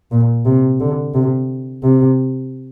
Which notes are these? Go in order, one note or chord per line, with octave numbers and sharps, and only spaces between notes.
A#2
C3
D3
C3
C3